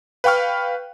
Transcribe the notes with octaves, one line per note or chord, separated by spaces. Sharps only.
B4 F5 G5 C#6 F6